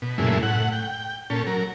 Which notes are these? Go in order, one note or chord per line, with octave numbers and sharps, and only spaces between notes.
B2
F#2 A#2 C#3 G#3 A3 E4
A2 F#5
G5
A#2 C#4 A4
F#3 A#4